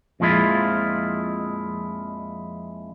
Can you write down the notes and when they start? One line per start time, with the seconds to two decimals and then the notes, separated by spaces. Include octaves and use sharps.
0.20 F2 A#2 F3 G#3 E4 F4